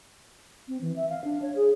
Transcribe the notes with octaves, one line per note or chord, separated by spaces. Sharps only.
C4
E3
E5
F5
D4
C#5
G#4